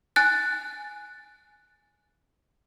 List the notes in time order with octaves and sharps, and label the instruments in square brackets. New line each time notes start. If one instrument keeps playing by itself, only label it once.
[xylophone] G#5 F#6 A6